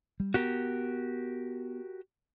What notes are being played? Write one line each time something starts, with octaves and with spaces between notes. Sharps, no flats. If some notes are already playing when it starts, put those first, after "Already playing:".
G3
B3 F#4 G4 A#4